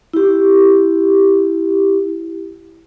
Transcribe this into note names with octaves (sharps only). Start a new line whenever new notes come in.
E4 G4